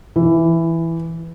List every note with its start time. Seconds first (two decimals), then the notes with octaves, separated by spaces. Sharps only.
0.16 E3